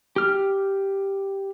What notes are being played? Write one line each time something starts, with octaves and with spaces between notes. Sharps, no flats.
G4 F6